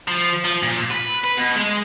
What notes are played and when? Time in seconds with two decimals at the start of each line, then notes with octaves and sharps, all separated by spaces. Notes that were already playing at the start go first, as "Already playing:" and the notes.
0.08 F3
0.45 F3
0.63 A#2
0.91 B4
1.24 B4
1.37 B2
1.56 G#3